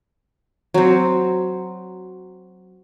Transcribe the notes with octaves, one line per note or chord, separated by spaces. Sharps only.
F#3 C4